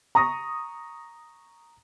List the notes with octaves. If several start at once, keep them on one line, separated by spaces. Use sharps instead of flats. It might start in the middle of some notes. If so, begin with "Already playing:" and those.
A#5 C#6 D#6 A#6